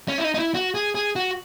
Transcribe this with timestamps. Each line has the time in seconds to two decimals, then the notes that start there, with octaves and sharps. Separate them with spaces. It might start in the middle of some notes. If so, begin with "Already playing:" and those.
0.08 C#4
0.18 E4
0.24 D#4
0.34 D#4
0.39 E4
0.55 F#4
0.75 G#4
0.95 G#4
1.16 F#4